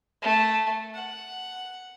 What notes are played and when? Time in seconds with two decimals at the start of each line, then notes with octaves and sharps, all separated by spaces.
0.22 A3
0.94 F#5